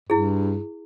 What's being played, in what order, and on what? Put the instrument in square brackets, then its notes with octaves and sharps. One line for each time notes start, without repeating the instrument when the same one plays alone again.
[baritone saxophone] G2 [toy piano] E4 G#4